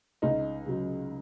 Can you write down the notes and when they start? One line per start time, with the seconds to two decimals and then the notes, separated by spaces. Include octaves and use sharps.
0.22 C#2 D#4
0.66 C#3 F#3